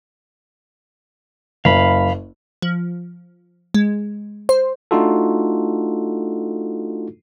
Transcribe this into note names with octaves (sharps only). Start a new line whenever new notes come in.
F#1 F5 B5
F3
G#3
C5
A3 D4 D#4 F4 F#4 A4